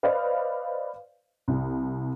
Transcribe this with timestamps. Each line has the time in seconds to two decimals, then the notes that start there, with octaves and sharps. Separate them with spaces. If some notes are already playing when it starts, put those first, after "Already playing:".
0.03 B4 C5 D5 D#5 F5
1.48 C2